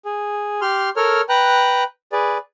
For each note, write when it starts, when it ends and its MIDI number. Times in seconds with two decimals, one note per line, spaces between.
0.05 0.61 68
0.61 0.89 67
0.61 0.89 84
0.61 0.89 89
0.96 1.22 69
0.96 1.22 70
0.96 1.22 73
0.96 1.22 89
1.29 1.84 71
1.29 1.84 79
1.29 1.84 82
1.29 1.84 90
2.12 2.38 68
2.12 2.38 71
2.12 2.38 74